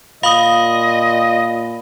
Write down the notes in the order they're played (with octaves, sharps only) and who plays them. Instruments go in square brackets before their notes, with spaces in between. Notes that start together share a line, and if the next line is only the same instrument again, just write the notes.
[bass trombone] A#2 [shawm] D#5 [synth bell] F5 D#6 [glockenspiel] B5 F#7 G7